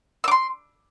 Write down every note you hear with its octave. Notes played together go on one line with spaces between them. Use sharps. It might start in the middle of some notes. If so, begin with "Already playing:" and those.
C6 D6 E6